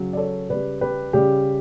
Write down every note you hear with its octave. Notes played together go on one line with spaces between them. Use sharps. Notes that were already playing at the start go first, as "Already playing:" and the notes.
Already playing: C#3 F#3
D5
A4 C#5
C#3 G3 B4 D5
G4 B4
C#3 G3 G4